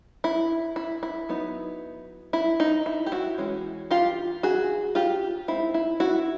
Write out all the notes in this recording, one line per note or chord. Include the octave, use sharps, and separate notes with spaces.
E4
E4
E4
F#3 B3 D#4
E4
D#4
E4
G4
E4 F#4
E3 G#3 C#4
F4 G4
F#4 G#4
F4 G4
G#3 C4 D#4 E4
E4
E4 F#4